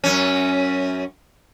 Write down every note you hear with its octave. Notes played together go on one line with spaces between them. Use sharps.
F#2 C#4